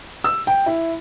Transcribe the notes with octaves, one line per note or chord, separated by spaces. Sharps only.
E6
G5
E4